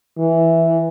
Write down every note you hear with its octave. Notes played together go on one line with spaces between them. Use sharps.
E3